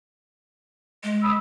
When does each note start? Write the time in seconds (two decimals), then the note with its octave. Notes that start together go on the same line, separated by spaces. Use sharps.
1.04 G#3
1.24 B5 D#6 E6